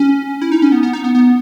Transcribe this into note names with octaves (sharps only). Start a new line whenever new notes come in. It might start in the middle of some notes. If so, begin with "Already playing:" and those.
Already playing: C#4
E4
D#4
C#4
B3
B3
D#4
B3
B3